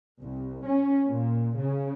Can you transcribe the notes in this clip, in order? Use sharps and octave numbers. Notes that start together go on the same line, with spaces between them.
C2
C#4
A#2
C#3